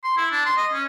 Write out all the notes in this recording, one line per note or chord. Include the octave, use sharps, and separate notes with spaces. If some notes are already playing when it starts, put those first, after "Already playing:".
C6
E4
D4
C6
D#5
C#4